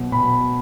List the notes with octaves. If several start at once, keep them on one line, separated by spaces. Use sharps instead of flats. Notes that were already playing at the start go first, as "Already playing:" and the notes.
Already playing: B2 F#3
B2 B5